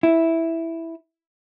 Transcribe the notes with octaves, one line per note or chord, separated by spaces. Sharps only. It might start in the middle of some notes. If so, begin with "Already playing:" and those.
E4